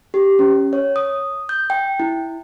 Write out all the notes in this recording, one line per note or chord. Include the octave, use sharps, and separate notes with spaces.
G4
C#4
C#5
D#6
G6
G5
E4